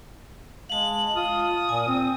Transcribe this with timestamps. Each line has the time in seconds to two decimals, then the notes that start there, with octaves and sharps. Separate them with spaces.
0.70 G#3 F5 A5 F#7
1.15 F4 D#6
1.69 A#2 G#5
1.88 C4